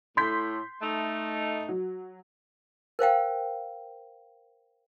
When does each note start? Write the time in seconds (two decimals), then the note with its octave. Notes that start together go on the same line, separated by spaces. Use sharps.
0.17 A2 C6 G6 B6
0.82 A3 D#4
1.69 F#3
2.99 A#4 C5 F5 G5